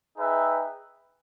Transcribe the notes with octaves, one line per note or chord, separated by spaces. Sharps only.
D#4 G#4 B4 E5 G5